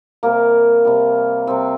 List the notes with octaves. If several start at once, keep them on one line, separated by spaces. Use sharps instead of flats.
C3 G3 A#3
C3 G3
C3 G3 C4